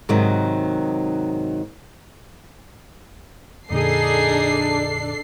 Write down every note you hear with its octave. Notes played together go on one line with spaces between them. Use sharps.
G#2 C3 D#3 F#3
F2 A#2 D3 D4 D#4 G#4 A4 C7